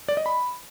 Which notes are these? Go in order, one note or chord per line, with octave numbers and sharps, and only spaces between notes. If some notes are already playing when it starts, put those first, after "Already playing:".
D5
D#5
B5